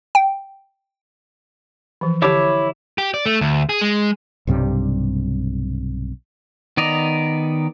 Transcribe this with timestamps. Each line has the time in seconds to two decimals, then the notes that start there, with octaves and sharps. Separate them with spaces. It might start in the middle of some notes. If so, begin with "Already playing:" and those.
0.15 G5
2.01 E3 F3
2.22 D3 E4 G4 C#5 D6
2.98 G4
3.14 D5
3.26 A3
3.41 D2
3.69 G#4
3.81 G#3
4.47 B1 G2 C3 G3
6.77 D#3 B3 D5 D#5 A#5